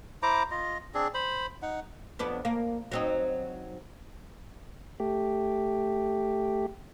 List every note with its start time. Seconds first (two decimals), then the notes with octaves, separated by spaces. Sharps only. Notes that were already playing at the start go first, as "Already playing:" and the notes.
0.23 E4 C5 A#5 D6
0.51 F4 D#5
0.94 C4 D4 G#4
1.14 C5 B5
1.62 D#4 F#5
2.19 F2 B3 D4
2.45 A#3
2.92 F#3 C4 D#4
5.00 A3 G4